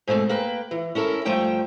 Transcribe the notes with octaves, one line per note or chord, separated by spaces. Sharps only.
G#2 B2 A3 C4
A#3 B4 G5
E3
C#4 E4 A4 A#4
G2 F3 A3 G5 A#5